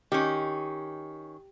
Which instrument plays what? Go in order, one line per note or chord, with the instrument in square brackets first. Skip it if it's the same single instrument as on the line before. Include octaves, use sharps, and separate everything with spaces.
[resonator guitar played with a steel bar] D#3 C#4 [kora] G4